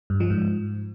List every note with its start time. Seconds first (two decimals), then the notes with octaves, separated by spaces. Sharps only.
0.10 G2
0.20 F3
0.30 G#2